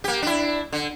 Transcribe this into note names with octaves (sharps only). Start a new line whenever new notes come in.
A#3 G4
D4 E4
D3